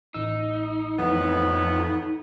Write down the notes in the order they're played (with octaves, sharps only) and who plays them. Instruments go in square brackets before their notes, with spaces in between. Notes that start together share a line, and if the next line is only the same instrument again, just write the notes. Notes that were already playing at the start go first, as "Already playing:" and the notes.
[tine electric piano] A1 E6 [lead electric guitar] D#4
[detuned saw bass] F2 [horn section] A2 B3 [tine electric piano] E3